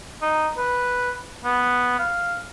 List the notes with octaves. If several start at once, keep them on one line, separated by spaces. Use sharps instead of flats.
D#4
B4
B3
F5